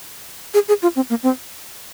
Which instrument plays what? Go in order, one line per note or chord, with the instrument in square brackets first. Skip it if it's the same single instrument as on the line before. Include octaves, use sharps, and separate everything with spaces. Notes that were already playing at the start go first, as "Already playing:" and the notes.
[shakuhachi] G#4
G#4
F4
C4
A#3
C4